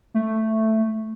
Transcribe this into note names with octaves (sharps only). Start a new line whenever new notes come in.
A3